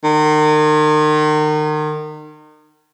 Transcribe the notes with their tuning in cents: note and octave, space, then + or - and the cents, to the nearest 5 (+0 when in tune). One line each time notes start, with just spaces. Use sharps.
D#3 -35